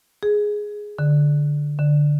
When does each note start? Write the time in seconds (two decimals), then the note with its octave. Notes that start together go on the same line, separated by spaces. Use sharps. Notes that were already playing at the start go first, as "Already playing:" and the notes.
0.23 G#4
0.99 D3
1.79 D3